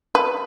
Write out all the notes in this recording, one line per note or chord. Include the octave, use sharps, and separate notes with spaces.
B4